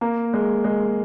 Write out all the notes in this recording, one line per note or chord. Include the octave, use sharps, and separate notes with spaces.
A#3
G#3
G#3